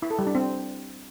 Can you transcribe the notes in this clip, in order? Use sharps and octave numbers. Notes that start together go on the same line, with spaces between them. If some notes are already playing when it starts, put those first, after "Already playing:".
E4
A4
G3
D4
C4